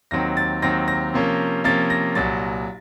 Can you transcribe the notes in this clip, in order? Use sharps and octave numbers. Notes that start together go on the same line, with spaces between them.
D#2 D#3 F#3 C4 A#6
A6
D#2 D#3 F#3 C4 A#6
A#6
C3 F3 A#3 C#4
C3 F3 A#3 C#4 A6
A#6
C2 A#2 F#3 A6